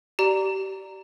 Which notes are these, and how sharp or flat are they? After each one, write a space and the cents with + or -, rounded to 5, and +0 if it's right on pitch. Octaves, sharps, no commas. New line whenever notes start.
G4 -30 D5 +0 A#5 -10